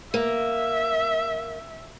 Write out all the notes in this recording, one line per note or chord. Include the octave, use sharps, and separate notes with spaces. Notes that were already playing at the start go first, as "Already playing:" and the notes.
A#3 E5